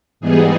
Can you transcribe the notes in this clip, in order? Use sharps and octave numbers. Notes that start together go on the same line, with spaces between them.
G#2 E3 G3 B3 D#4 G#4